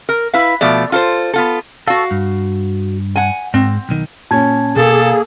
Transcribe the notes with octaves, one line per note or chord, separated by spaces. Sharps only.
A#4
E4 B4 F5
B2 F3 A3 D5
F4 A4 A#4 C5
B3 F4 A4
F#4 A4 F5
G2
F#5 G#5
G#2 C4
B1 D#3
A#2 C#4 A5 G#6
B2 A#3 G#4 A4 A6